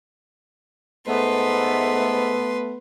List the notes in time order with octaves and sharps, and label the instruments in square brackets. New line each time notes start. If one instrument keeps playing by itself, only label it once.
[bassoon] G#2 [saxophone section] A3 B3 [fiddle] B4 C6